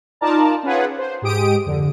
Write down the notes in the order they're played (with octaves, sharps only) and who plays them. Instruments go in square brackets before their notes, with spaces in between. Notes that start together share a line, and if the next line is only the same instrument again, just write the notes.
[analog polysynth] D#4 F4 A#4 D5 A5 A#5
C#4 F4 G#4 B4 F#5
C5
G#2 G#3 G4 D#6 D7
F2 D3